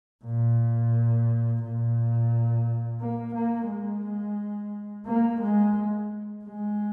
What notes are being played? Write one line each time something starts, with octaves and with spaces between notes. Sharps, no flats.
A#2
A#2
A#3
A#3
G#3
A#3
G#3
G#3